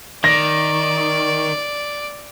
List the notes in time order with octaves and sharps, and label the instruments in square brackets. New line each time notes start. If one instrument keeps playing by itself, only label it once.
[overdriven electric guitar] D#3 [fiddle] D5 [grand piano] A#6